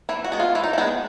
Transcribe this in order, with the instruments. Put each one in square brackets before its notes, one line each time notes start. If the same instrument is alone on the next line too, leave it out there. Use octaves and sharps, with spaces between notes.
[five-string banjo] E3 E4
F#4
G#3 B3
F4
E3 E4
D#4
E4
G#3 B3 D4